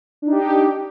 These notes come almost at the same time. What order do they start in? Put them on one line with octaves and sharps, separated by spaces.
D4 D#4 G4